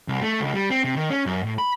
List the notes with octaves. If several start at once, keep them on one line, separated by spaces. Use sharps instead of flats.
C2
A3
C#2
G3
C4
C3
D#3
C#4
F#2
A2
B5